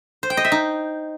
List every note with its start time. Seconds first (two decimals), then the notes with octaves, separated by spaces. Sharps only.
0.23 C5
0.30 G5
0.37 D#5
0.45 E5
0.52 D#4